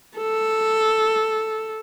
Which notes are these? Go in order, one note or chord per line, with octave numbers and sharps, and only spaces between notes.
A4